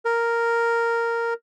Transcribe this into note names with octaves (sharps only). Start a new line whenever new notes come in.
A#4